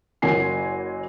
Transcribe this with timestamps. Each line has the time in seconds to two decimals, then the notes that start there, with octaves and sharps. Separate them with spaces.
0.22 F#1 F#3 A#3 G#5 C7